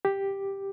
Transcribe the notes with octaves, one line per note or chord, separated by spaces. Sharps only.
G4